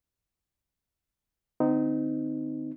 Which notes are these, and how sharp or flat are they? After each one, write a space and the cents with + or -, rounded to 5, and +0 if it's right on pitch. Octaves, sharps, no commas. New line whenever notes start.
D3 +0 C4 -40 D#4 -5